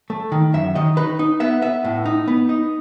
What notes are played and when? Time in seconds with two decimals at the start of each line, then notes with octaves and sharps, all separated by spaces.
0.10 A3
0.32 D#3
0.54 F#2 E5
0.75 D#3 D#5
0.97 D#4 B4
1.19 D#4
1.40 B3 E5
1.62 B3 E5
1.84 A2
2.05 D#4
2.28 B3
2.49 D#4